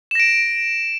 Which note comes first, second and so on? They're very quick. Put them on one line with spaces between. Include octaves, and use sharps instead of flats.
E7 A#6 D7